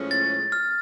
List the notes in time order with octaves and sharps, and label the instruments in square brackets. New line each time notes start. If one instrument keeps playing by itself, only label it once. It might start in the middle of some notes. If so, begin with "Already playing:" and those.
Already playing: [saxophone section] A2 F3 G#3 C#4
[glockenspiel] A6
F6